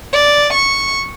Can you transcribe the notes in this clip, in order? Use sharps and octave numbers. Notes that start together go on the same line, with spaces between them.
D5
C#6